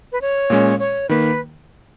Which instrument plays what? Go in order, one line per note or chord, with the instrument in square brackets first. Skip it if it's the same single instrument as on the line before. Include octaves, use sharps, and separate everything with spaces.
[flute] B4
C#5
[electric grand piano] A#2 G#3 C#4
[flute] C#5
[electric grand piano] D#3 A#3 [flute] B4